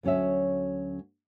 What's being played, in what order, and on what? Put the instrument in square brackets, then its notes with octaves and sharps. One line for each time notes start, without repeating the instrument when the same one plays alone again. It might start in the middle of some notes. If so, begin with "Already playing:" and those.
[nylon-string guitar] D2 F#3 C#4 C#5 E5